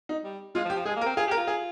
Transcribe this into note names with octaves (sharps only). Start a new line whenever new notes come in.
D#4
G3
G#3 F4
F3
G4
F3
G#3 G#4
A#3
A#4
C4
F4 G#4
G4 A#4
F4
G#4